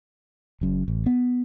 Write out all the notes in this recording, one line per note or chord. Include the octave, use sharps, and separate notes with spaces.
F#1 F#2
A1
B3